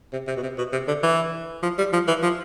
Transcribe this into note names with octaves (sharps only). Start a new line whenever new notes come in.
C3
C3
B2
C3
B2
C3
D3
E3
F3
G3
F3
E3
F3